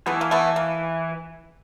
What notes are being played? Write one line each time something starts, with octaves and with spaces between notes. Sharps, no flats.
E3 A3 B3
A#3
A3 B3
A#3